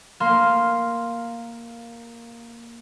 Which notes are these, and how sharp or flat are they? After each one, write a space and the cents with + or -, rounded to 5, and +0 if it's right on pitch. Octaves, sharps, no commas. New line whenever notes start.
A#3 +0 F5 +0 C6 +0